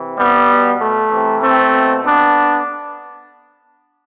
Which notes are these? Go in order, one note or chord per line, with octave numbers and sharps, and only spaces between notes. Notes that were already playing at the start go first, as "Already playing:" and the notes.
Already playing: C3 E3
G3 B3
B2
A3
C3 E3
A3 C4
B2
B3 D4